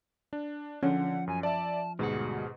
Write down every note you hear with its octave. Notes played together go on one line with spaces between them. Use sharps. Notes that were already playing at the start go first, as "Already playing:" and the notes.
D4
D3 F3 C#4 F#5
F#2 G#5
D5 E5 A5
D2 G#2 B2 G3 F#4 G#4